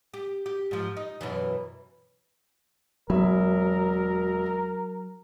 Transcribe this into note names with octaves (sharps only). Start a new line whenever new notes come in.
G4
G4
G#2 F3
D#4
F#2 B2 E3
E1 F#3 A#4 E5 B5